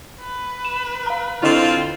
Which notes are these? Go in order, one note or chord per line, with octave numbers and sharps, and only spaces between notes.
B4
E7
F5 A#5
D3 C4 E4 F4 D#5